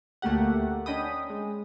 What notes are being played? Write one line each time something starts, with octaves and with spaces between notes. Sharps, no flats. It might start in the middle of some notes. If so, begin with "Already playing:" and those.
D2 A3 A#3 G4 F#5
C#4 D4 D#5 G5 B5 D#6
G#3